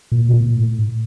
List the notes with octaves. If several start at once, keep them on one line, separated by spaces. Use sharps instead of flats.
A#2
C3
A#2
A2